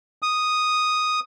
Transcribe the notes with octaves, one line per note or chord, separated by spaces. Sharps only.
D#6